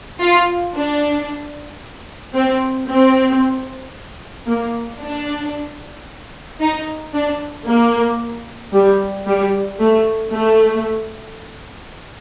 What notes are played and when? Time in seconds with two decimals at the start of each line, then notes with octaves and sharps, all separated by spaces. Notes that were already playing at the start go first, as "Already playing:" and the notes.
0.22 F4
0.75 D4
2.35 C4
2.88 C4
4.48 A#3
5.00 D4
6.60 D#4
7.14 D4
7.67 A#3
8.74 G3
9.26 G3
9.79 A3
10.33 A3